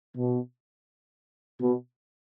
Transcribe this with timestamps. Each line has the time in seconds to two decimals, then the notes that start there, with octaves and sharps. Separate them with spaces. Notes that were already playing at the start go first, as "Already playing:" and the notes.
0.16 B2
1.60 B2